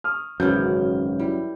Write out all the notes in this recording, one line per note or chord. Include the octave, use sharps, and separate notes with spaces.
C#6 D#6 F6
G#1 F#2 C#3 E3 F#3 G6
G3 E4